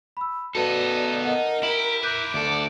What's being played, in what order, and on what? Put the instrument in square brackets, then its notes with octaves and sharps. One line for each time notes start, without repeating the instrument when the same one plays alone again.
[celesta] B5 E6
[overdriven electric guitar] B3 A4 [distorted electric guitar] D#4 [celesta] F#4 B4 A5 [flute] D5
[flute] A#4 [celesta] D#5 F#5
[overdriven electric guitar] E4 [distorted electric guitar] G4 [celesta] F#7
[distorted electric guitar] A#4 B4 [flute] D6 [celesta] F#6 G6
[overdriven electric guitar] D2 A4 [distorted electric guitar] D5